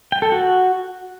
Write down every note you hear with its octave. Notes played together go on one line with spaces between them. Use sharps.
G5
A4
F#4